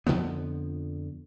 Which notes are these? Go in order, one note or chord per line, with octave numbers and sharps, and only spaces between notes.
F2 D3 F3 B3